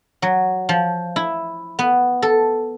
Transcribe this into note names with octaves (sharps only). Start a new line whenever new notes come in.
F#3
F3
E4
B3
A4